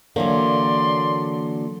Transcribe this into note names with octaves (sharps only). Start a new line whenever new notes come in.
D3 E3 F#3 A#3 D5 C6